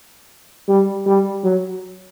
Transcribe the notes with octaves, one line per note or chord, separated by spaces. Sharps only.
G3
G3
F#3